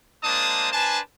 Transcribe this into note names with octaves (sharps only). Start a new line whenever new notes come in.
G#3 A#3 D4 C5 A5 D#6
D4 B4 C5 G#5 A5